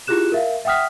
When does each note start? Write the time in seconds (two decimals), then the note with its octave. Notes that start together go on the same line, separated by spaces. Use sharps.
0.07 E4 F4 G4 G#4 F#6 E7
0.32 A#4 E5 F5
0.65 E5 F#5 G5 D#6 F6 B6